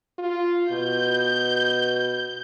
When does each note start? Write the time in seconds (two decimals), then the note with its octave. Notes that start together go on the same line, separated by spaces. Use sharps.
0.19 F4
0.71 B2 G6